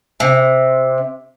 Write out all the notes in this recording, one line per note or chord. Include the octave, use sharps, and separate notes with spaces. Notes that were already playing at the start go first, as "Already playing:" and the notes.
C3